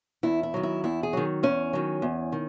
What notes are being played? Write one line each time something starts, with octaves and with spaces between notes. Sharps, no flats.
E2 E4
E4
D#3 F#3
E4
E2 E4
G#4
D#3 F#3
E2 C#4
D#3 F#3
E2
D#3